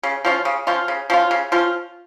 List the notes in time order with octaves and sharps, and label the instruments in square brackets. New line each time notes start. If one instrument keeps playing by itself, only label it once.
[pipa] C#3
F3 C#4 F4
C#3
F3 C#4 F4
C#3
F3 C#4 F4
C#3
F3 C#4 F4